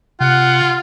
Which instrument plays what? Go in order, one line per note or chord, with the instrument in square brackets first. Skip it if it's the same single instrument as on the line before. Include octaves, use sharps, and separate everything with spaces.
[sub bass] C3 [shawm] F4 [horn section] F#5